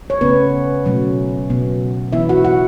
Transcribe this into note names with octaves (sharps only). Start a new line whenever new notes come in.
C#5
C#3 A3 B3 C#4 B4
B2 F#3 A3 C#4
B2 F#3 B3
E3 B3 E4 E5
F#4 F#5
F#4 F#5